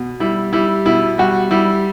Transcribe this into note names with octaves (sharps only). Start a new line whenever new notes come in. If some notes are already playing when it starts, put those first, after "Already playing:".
Already playing: B2
G3 E4
G3 E4
B2 E4
G3 F#4
G3 E4